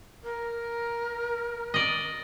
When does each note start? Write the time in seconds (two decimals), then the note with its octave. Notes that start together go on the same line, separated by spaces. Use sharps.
0.24 A#4
1.74 D5 D#5